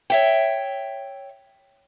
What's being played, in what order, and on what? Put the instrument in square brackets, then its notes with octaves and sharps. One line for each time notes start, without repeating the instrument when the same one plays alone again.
[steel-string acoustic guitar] C#5 E5 G5